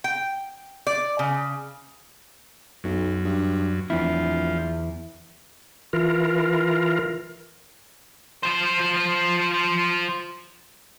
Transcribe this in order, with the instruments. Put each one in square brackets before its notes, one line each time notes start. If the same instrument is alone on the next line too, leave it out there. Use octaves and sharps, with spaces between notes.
[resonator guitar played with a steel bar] G5
D5
C#3
[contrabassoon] B1 [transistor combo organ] F#2
[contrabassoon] G2
[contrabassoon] D1 [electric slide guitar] E2 E4 [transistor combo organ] F3
[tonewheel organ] E3 F4 A#4
[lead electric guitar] F3 C5